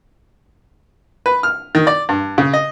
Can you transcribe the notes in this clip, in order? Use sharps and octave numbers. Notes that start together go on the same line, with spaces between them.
B4
F6
D#3
D5
G2
C#3
D#5